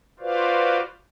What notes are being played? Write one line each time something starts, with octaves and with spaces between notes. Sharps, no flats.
F4 F#4 B4 C5 D5 F5